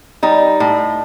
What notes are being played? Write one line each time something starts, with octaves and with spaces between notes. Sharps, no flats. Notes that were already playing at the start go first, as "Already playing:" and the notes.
G3 D#4
A2